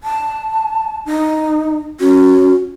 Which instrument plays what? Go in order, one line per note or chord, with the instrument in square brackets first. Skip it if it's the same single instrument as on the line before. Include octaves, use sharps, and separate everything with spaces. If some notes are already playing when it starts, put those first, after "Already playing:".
[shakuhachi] A5
D#4
[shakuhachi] C#4 [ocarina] F#4